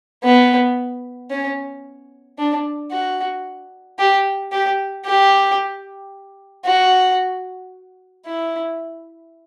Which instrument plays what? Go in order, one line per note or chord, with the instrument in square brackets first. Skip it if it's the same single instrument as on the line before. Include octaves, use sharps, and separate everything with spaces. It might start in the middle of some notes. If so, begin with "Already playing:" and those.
[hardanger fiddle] B3
C#4
D4
F#4
G4
G4
G4
F#4
E4